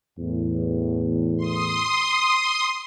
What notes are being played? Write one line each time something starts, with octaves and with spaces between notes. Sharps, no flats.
E2 A2
C6 D#6